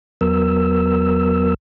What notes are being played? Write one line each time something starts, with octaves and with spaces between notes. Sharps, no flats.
E2 F#3 B3 A#4 E6